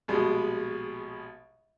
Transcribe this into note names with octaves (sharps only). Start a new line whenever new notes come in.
A#1 B2 G3 G#3